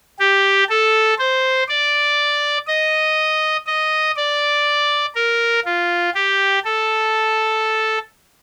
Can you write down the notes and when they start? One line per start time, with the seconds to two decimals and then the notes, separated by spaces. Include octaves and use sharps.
0.19 G4
0.69 A4
1.19 C5
1.69 D5
2.67 D#5
3.66 D#5
4.16 D5
5.15 A#4
5.65 F4
6.15 G4
6.64 A4